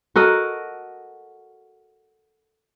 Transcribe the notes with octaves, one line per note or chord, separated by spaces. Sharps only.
F#4 A4 A#4 D#5